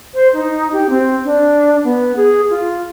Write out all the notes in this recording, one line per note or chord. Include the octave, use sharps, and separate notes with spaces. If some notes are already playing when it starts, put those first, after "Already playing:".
C5
D#4
G4
C4
D4
B3
G#4
F4